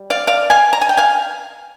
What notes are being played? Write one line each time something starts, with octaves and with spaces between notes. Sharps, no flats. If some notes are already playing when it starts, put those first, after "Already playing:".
Already playing: G3
D5 F5
D5 F5
F5 G#5
A#5
G#5
G5
F5 G#5